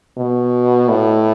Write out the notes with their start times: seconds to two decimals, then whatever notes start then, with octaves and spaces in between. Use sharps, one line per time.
0.17 B2
0.89 A2